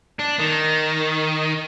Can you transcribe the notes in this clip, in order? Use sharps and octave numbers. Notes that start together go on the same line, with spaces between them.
D4
D#3